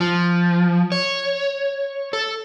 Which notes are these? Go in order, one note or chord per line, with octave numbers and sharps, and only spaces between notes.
F3
C#5
A4